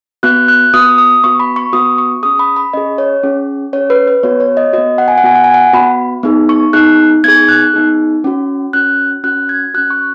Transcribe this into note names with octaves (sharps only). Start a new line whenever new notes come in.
B3 F#4 F#6
F#6
B3 F#4 D#6
D#6
B3 F#4 C#6
B5
C#6
B3 F#4 D#6
C#6
C#4 G#4 D#6
B5
B5
C#4 G#4 D#5
C#5
C#4 G#4
C#4 G#4 C#5
B4
B4
B3 F#4 C#5
C#5
D#5
B3 F#4 D#5
F#5
G#5
F#5
B3 F#4 G#5
F#5
G#5
F#5
B3 F#4 B5
B3 D#4 G#4
C#6
B3 D#4 G#4 F#6
B3 D#4 G#4 G#6
F#6
B3 D#4 G#4
C#4 F#4
C#4 F#4 F#6
C#4 F#4 F#6
G#6
C#4 F#4 F#6
C#6